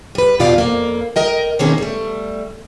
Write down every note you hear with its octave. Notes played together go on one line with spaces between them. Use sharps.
G3 B4
E2 B2 F4 G4 D5 F5
F2 A#3
A#4 D#5 G5
B2 D#3 A#3 C4 C#4 G#4
G3 A3